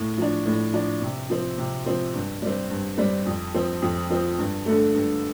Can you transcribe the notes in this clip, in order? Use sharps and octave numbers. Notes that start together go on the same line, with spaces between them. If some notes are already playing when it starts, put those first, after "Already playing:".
Already playing: A2
F3 D4
A2
F3 D4
C3
F3 C4
C3
F3 C4
G2
G3 C4
G2
G3 C4
F2
F3 C4
F2
F3 C4
G2
D3 A3
G2